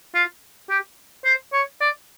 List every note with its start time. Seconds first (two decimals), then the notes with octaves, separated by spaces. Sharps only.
0.15 F4
0.70 G4
1.25 C5
1.53 C#5
1.81 D5